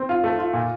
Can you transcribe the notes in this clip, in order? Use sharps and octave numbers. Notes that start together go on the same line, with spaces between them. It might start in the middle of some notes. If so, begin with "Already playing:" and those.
Already playing: C4
F4
A3
F4
A#2